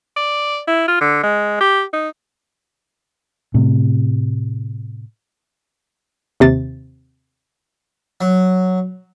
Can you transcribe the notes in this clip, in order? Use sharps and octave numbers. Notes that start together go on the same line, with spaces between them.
D5
E4
F4
D3
G#3
G4
D#4
A2 C3
D#2 C3 A6
F#3